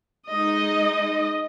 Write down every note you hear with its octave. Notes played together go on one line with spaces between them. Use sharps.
G#3 D#4 D#5